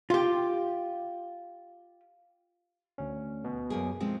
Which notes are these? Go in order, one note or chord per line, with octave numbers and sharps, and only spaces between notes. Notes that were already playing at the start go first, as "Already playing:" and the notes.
F4 G4
D2 C#4
B2
F#2 A#3 G#4
F3 G#3 C4